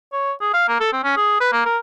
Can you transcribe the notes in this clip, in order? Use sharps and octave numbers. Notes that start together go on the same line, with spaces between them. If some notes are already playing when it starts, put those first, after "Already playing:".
C#5
G#4
F5
A#3
A4
C4
C#4
G#4
B4
A#3
A#4